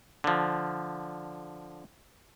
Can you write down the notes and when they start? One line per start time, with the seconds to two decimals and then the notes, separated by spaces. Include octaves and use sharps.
0.24 D3 F3